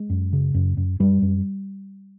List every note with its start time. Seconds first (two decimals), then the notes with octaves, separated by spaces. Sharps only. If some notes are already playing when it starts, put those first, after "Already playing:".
Already playing: G#3
0.10 F#2
0.33 C#3
0.54 F#2
0.77 F#2
1.00 F#2 G3
1.22 F#2